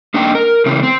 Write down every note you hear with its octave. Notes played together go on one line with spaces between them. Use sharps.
A#3 D4 D#4 G5
A#4
C#3 E3 C4
C4